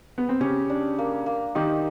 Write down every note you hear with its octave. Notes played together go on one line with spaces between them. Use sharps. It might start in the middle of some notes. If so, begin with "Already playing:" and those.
B3
C4
C#3 C#4 G4
D4
A#3
A#3
D#3 D#4 G4